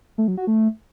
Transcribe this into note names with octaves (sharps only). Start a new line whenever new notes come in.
A3
F#3
F#4
A3